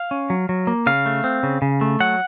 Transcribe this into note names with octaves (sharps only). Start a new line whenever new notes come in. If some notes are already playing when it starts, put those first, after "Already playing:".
Already playing: F5
C#4
F#3
F#3
A#3
C#3 F5
A3
C4
C#3
C#3
A3
F#3 F#5